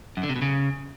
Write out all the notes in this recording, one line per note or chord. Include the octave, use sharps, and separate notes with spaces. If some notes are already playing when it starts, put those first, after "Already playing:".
F#2
D3
C3
B2
C#3